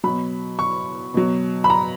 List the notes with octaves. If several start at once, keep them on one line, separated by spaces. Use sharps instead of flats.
B2 F#3 B5
C#6
B2 F#3
B5
A#5